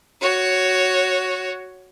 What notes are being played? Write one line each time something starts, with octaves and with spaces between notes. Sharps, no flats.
F#4 C#5